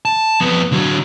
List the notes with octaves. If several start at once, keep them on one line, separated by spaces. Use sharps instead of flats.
A5
F2 B3
D3 F#3